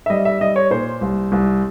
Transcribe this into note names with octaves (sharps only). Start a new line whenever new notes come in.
E5
G3 D#5
E5
G3 D#5
C#5
A#2 C5
C2
C2